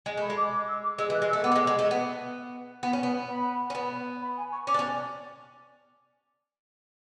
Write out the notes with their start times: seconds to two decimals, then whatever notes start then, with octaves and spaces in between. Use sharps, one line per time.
0.06 G#3
0.17 A3 B5
0.30 G#3
0.37 D6
0.52 D6
0.67 E6
0.83 D6
0.98 G#3 E6
1.10 E3
1.14 F#6
1.22 G#3
1.29 E6
1.33 A3
1.44 B3 D6
1.52 A3
1.56 G#3
1.67 G#3
1.79 A3
1.91 B3
2.83 B3
2.93 C#4
3.03 B3
3.29 B5
3.70 C#4
3.75 B3
4.22 B5
4.37 G#5
4.52 C#6
4.67 C#4 D6
4.74 D4
4.79 C#4